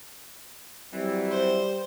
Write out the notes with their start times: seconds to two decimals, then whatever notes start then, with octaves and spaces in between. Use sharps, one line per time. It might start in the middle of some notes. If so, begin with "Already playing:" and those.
0.93 E3 F#3 G3 C4
1.31 C5